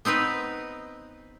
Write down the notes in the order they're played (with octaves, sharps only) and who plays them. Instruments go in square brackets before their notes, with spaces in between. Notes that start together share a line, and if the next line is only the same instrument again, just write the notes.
[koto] B3 C4 D#4 B4